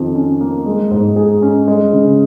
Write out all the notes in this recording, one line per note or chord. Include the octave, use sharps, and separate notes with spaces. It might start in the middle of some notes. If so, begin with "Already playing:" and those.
Already playing: F2 D#3 F3
C#4
A#3
G#3
G#2
G#4
C#4
G#3
C#3